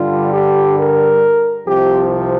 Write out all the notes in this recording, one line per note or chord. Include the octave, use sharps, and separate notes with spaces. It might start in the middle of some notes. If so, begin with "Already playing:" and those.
Already playing: G2 D3 G3 F4
G4
A#4
C2 C3 F3 G4